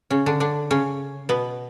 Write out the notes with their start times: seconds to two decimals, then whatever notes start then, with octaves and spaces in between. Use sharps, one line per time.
0.10 C#3 C#4
0.26 D3 D4
0.40 D3 D4
0.71 C#3 C#4
1.29 B2 B3